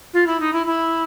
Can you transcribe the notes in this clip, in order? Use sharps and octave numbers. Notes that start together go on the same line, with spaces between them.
F4
E4
D#4
E4
E4